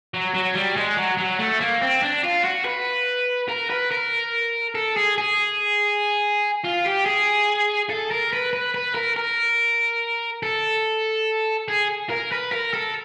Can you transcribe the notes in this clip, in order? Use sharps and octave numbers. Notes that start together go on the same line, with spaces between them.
F#3
F#3
G3
G#3
F#3
F#3
A3
A#3
C4
D4
F4
F#4
B4
A#4
B4
A#4
A4
G#4
G#4
F4
G4
G#4
A4
A#4
B4
B4
B4
A#4
A#4
A4
G#4
A#4
B4
A#4
A4